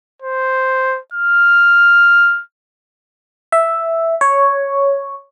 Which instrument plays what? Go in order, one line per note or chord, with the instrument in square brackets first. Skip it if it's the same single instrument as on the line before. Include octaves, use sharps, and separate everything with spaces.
[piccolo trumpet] C5
F6
[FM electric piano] E5
C#5